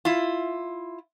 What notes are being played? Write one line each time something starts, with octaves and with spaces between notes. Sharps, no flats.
E4 F4